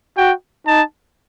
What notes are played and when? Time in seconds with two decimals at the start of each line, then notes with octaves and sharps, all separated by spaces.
0.17 F#4 G5
0.67 D#4 A5